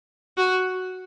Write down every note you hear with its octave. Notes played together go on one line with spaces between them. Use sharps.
F#4